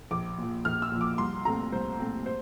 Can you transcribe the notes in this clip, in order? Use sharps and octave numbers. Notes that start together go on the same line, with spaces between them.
A#1 D6
A#2 F3
A#1 F6
E6
A#2 F3
D6
C2 C6
A#2 A3 C4 A#5
C2 C5
A#2 A3 C4
C5